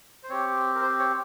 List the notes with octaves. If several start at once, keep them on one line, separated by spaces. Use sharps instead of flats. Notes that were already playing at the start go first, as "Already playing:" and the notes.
C5
C4 G4 C#5
A#4
C5
C#5